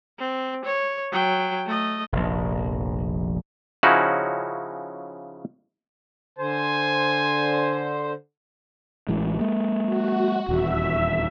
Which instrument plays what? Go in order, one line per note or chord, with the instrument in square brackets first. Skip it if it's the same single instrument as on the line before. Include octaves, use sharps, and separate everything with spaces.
[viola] C4
C#5
F#3 G5
A3 D#5
[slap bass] F1 A#1
[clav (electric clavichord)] C#3 F3 C#4 D#4 E4 F#4
[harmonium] D3 C5 [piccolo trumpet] G#5
[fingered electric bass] A1 E3 G#3
G#3 A#3
[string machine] F#4
[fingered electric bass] D#1 E2 [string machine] E5